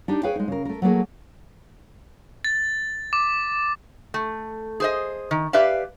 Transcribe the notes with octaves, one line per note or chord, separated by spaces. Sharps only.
D4 D#4 G4
G#4 B4 C#5 F5 G5
G#3 D#4
C#3 A#4
A3 A#4
F#3 A3 A#3 G#4
A6
D6
A3
G#4 C5 D#5
D#3
G4 B4 D5 E5 F5